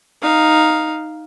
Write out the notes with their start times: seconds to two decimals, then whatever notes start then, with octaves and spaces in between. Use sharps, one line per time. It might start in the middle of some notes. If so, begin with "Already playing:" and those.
0.22 D#4 F5